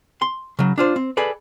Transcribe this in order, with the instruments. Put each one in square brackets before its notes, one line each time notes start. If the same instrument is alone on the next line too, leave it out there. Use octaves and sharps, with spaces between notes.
[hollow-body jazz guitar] C6
C#3 F#3
D4 F4 C5
C4
G#4 A4 B4 D5